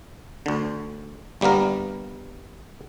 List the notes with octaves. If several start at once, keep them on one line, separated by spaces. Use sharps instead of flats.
D2 D3
G1 G3 A#3 B3 A#4